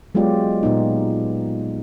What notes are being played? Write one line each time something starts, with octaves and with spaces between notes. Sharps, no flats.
F#3 G#3 B3 F4 G4 D5
A#2 B3 D#4